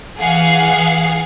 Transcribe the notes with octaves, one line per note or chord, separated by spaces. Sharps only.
E3 G#4 F5 F#5